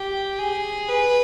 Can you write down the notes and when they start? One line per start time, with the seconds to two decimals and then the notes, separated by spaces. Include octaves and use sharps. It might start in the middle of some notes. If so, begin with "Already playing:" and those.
Already playing: G4
0.39 G#4
0.88 B4